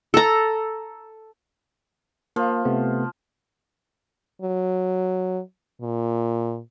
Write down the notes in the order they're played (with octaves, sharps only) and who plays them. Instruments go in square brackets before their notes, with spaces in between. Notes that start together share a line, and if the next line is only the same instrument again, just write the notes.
[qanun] A4 A#5
[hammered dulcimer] F3 [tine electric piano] A#3
[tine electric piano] C3 A3 B3
[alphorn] F#3
A#2